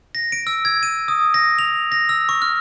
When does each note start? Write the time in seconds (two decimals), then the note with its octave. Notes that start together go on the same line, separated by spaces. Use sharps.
0.15 A#6
0.32 D7
0.47 E6
0.65 G#6
0.83 D#7
1.08 D#6
1.34 A#6
1.59 F7
1.92 A#6
2.09 E6
2.29 C#6
2.42 F6